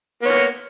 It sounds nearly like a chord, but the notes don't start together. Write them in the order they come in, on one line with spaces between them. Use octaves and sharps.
B3 C#5 A#3